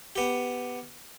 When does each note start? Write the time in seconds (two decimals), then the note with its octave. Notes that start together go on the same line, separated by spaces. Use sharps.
0.16 B3 G4